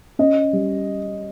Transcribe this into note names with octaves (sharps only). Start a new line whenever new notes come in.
C#4 D#5
G3